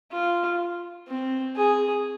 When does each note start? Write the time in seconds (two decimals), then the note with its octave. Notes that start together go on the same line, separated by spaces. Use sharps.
0.12 F4
1.08 C4
1.56 G#4